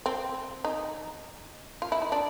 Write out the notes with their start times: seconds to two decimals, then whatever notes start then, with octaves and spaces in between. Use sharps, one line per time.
0.06 C4
0.64 D#4
1.82 F4
1.92 E4
2.02 D#4
2.12 D4